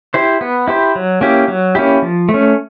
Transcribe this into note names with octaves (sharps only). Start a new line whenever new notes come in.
E4 G4 C5
B3
E4 G4 C5
F#3
A#3 C#4 E4 G4
F#3
A#3 C#4 E4 G4
F3
A3
C#4